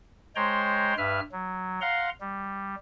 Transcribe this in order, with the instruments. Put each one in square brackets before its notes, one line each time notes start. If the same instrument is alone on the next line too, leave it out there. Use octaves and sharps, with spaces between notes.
[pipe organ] G#3 C5 C#5 G5 A#5 C6
G2 B4 E5 F6
F#3
F5 F#5 A#5 C6
G3